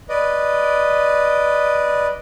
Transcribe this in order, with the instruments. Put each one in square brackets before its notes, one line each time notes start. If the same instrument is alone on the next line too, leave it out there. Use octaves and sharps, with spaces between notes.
[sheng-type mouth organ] B4 D5 D#5